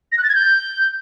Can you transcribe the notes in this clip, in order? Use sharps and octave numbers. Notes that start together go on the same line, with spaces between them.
A#6
F#6
A6
G#6
G6